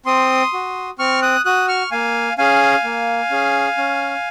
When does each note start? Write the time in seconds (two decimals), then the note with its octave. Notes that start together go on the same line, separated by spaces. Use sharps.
0.06 C4 C6 D#6
0.53 F#4
0.99 C4 C#6 F6
1.22 D#6 F#6
1.45 F#4 D#6 F#6
1.68 C#6 F6
1.91 A#3 F5 G#5
2.38 C#4 G#4 F5 G#5
2.84 A#3
3.30 C#4 G#4
3.78 C#4